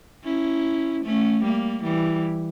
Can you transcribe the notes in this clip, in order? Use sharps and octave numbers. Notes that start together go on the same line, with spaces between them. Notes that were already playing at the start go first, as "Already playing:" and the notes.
C#4 E4
A3 C#4
G3 A#3
E3 G3